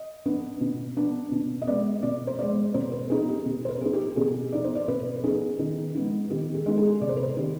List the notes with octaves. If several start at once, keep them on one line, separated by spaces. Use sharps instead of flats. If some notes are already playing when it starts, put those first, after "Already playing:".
Already playing: D#5
B3 D4
B2
B3 D4
B2
D#5
G#3 B3 D5
B2 D5
C5
G#3 B3 D5
B2 C5
B4
B3 D#4 G#4
G4
B2
C5
B4
B3 D#4 G#4
G4
B2 G#4
B3 D#4 D5
C5
D5
B2 B4
B4
B3 D#4 G#4
D#3
G#3 B3 D#4
D#3 G4
G#4
G#3 B3 D#4
G#4
C3 D5
C5
B4
C5
D#3 B3 G4